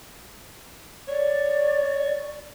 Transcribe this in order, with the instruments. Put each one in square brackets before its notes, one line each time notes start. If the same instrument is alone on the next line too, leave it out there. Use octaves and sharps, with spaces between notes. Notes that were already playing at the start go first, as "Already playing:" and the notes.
[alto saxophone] C#5 [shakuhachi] D5